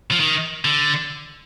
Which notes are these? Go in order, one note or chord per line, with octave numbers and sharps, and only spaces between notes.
F3
D#3
D3